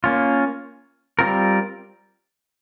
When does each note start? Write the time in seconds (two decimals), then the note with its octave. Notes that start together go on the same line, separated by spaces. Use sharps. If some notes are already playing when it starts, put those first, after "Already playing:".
0.04 A#3 C#4 F4
1.19 G3 C4 F4 A#4